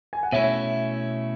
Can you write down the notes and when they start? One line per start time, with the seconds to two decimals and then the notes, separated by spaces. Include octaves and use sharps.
0.13 G#5
0.23 F#5
0.32 B2 A3 C#4 E4 C#5 E5